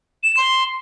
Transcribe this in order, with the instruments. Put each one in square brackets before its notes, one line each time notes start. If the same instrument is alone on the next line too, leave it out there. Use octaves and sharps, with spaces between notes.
[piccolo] E7
C6